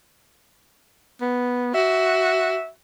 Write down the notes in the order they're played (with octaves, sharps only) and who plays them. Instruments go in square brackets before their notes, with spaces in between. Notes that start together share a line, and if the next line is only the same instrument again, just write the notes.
[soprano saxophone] B3
[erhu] F#4 [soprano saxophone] E5